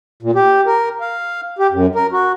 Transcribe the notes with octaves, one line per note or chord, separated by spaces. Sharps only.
A#2
G4
A#4
F5
G4
F#2
A#4
F#4